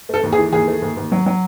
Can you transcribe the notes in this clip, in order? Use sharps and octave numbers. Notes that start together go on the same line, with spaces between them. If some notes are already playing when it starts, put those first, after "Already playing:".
A3 A4
D#2
G#4
E3
D#2 G#4
A3
D#2
D#2
F#3
F#3